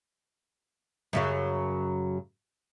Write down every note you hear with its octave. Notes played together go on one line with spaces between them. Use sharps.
F#2 C#3 F#3